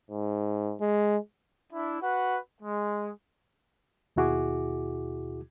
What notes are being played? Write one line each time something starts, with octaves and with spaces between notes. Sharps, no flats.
G#2
G#3
D4 E4
F#4 B4 F#5
G#3
D#2 B2 E4 F#4 G#4 D6